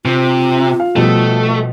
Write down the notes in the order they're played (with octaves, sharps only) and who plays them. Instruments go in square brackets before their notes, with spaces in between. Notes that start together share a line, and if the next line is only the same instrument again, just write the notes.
[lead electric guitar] C3 [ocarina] F4
[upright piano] F5
[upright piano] B2 F3 G3 [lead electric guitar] A3